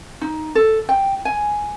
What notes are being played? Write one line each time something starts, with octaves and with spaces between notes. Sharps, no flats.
D#4
A4
G5
G#5